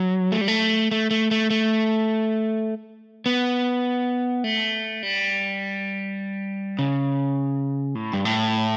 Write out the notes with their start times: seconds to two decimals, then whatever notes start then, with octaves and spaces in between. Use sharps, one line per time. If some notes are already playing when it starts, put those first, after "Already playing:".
Already playing: F#3
0.32 A3
0.41 G3
0.48 A3
0.91 A3
1.11 A3
1.31 A3
1.50 A3
3.26 B3
4.44 A3
5.03 G3
6.79 C#3
7.95 A2
8.13 G2
8.25 A2